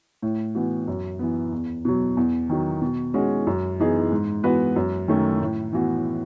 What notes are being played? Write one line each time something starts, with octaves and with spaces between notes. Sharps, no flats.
A2
E3 B3 F#4
F#2
E3 B3
E2
B2 F#3
E2
D#3 F#3
B2
G#3 C#4 F#4
F#2
E3 B3 D#4 G#4
G#2
E3 B3 F#4 B4
F#2
D#3 F#3 A3 C#4
A2
E3 B3 F#4